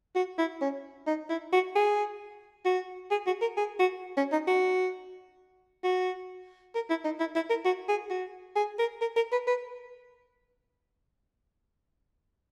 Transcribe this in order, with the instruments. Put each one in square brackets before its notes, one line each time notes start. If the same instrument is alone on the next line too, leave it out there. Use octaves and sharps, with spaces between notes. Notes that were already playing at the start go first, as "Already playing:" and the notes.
[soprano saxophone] F#4
E4
C#4
D#4
E4
F#4
G#4
F#4
G#4
F#4
A#4
G#4
F#4
C#4
D#4
F#4
F#4
A#4
E4
D#4
E4
E4
A#4
F#4
G#4
F#4
G#4
A#4
A#4
A#4
B4
B4